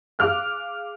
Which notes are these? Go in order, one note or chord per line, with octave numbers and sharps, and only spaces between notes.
G#4 F5 D6 F6 F#6